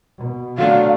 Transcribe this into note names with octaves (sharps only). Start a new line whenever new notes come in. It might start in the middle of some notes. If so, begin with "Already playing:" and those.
B2
F#3 A3 D4 F5